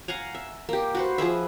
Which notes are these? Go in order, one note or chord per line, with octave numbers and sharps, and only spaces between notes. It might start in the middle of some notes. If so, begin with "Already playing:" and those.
F5 F#5 G#5 A#5
E5
A#3 G4
F#4 B4 C5
F3 G#4 B4 E5